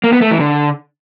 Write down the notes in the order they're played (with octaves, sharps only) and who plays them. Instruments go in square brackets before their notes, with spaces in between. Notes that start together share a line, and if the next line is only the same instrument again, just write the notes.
[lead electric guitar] A#3
B3
A3
E3
D3